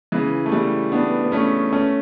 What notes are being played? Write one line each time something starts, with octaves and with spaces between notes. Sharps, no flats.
C#3 E3
A3
E3 G3
B3 D4
B3
A3 C#4
A3 C#4